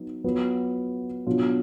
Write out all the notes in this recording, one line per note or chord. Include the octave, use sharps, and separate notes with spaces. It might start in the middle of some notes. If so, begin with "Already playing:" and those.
Already playing: F#3 B3 D#4
F#3 B3 F4
B2 F#3 D4 F4